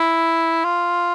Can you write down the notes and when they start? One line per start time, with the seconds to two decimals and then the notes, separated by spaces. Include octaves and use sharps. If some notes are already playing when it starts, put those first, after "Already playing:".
Already playing: E4
0.64 F4